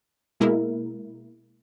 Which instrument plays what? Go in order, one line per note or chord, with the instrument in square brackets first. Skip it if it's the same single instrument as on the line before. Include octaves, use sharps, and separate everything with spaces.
[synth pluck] B2 G#3 A#3 E4 A#4